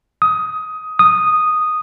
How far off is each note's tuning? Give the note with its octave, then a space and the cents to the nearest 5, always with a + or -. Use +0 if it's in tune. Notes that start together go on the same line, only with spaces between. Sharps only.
D#6 +15
D#6 -5